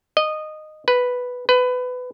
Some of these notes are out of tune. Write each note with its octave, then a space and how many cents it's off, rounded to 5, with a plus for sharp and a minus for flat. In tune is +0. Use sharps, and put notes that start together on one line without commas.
D#5 -15
B4 +0
B4 +20